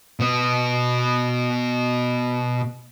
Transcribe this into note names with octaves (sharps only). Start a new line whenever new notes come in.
B2 B3